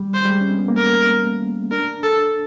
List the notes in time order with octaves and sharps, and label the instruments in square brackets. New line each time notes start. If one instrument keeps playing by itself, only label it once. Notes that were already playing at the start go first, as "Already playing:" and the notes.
Already playing: [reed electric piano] G3
[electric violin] C5
[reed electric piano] G3
G#3
C#4
C4
B3
A#3
[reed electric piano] A3 [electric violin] A#4
[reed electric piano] D4 [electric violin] A#4
[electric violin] A4